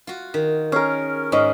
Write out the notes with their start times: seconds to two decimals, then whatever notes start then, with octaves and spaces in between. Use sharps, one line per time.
0.07 F4 F#4
0.34 D#3
0.72 C#4 G#4 A#4
1.32 G#2 C#4 D#5